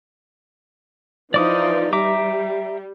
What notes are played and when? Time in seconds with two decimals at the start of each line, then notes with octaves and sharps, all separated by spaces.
1.34 E3 F3 D#4 D5 D6 D#6
1.93 G3 E5 A#5 D6